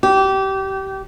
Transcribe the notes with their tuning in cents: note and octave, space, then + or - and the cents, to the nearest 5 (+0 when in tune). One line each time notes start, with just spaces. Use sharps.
G4 -25